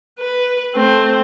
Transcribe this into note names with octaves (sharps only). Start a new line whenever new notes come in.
B4
A3 C4